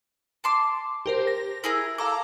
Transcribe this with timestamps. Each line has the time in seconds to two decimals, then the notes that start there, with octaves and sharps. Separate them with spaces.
0.44 A5 C6 D6
1.06 G4 A#4 C5
1.27 A#6
1.64 E4 G#4 A#4
1.98 A4 F5 A#5 D6